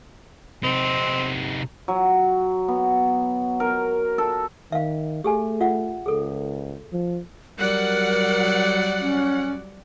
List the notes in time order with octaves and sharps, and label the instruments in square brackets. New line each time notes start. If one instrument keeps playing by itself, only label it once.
[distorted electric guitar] C3 D#4 [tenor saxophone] C4
[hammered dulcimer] F#3
B3
A#4
A4
[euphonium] D#3 [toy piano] E5 F5
[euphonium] A3 [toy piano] G4 G#4 G#5
[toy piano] F4 E5 F#5
[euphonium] C#2 [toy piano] G#4 A4
[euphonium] F3
[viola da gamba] F#3 G3 D5 [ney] A#4 [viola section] F#5
[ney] C#4